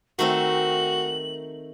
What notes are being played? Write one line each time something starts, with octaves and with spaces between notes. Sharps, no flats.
D#3 A3 C4 F#4 F#7